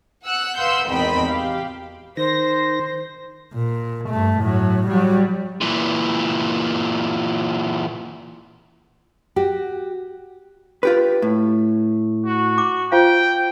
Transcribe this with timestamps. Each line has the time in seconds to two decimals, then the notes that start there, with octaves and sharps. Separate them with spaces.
0.23 F#5 E6 F#6
0.57 B4 F5 F#5 C6 E6 G6
0.86 G#1 E2 C4 D#5 G5 B5
1.26 G4 F5
2.17 D#3 C5 A#6
3.54 A#2
4.10 G2 A3
4.40 A2 F#3
4.87 F#3 G3
5.61 A#2 E3
9.36 F#4 G4
10.83 F4 G4 B4
11.22 A2
12.26 F#4
12.58 D6
12.92 F4 C5 F5 G5